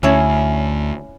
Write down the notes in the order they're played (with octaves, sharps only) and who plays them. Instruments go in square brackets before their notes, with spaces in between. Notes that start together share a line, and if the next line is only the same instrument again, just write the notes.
[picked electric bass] D2 [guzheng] C#4 E4 C#5